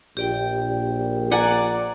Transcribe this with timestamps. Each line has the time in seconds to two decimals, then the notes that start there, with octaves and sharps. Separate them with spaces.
0.17 A#1 G4 D5 G5
1.31 D5 F#5 G#5 A#5